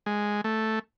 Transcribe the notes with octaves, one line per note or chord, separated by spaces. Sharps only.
G#3
A3